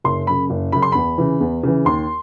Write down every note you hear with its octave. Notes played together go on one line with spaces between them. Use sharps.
F#1 C6
F#2 C#3 B5
F#1
F#2 C#3 B5
C6
E2 B5
C#3 E3
E2
C#3 E3
D#2 C6